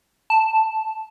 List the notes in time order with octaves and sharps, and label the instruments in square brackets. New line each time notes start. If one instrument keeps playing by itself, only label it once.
[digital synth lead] A5